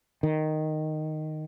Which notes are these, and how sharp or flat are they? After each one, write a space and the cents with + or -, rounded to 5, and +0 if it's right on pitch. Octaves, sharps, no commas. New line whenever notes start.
D#3 -5